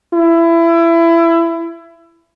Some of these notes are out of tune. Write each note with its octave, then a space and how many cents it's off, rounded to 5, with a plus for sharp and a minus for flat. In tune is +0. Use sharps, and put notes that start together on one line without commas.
E4 +25